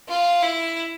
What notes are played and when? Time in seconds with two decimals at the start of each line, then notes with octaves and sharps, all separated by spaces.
0.09 F4
0.43 E4